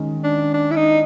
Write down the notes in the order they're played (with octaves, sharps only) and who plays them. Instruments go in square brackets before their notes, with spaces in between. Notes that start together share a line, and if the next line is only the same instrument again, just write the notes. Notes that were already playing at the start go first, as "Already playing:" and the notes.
Already playing: [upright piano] D#3 G#3 C#4
[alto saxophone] D4
D4
E4
D#4